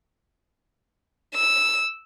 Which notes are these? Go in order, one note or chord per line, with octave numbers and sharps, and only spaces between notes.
E6